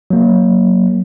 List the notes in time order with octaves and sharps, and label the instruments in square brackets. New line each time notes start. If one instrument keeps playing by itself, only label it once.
[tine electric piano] F#3 A#3